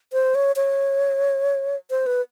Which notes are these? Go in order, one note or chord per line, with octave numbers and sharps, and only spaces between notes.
C5
C#5
C#5
C5
B4